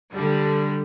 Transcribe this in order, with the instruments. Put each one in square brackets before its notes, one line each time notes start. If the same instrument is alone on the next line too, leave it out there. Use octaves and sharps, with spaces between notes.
[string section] D3 G3